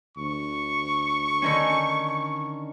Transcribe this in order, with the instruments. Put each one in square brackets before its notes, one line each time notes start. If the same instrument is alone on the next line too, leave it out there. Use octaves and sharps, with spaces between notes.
[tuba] D2 [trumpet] C#6
[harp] D3 D#3 C#4